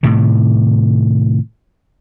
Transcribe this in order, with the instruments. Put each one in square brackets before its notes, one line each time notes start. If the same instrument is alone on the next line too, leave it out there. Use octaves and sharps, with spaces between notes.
[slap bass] A2 C3 D#3